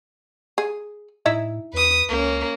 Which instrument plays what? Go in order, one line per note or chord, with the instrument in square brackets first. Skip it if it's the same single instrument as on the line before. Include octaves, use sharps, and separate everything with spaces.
[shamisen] G#4
[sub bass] A2 [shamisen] D#4 E4 E5
[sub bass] E2 [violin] B4 D#6
[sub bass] C#2 [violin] A#3 C#4